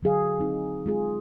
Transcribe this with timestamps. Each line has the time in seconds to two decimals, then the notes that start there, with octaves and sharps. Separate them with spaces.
0.03 D3 F#3 G#4 F5
0.40 C4 D#4
0.86 G#3 F4 G#4